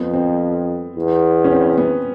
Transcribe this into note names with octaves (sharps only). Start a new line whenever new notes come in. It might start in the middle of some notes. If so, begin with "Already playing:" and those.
Already playing: F2 B3
C4
E2
C#4
C4
B3